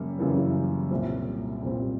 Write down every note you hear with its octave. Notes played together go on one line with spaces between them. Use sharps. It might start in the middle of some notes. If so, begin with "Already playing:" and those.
Already playing: F#2 C#3 G3 A#3
F#2 C#3 E3 G3 A#3
C2 A#2 G3 C4
C2 A#2 G3 C4